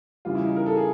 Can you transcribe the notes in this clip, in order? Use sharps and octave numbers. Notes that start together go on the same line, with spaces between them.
C#3 E3 G3 F4
E4
D#4
A#4
A4
G#4